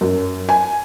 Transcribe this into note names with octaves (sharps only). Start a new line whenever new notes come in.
F#2
G#5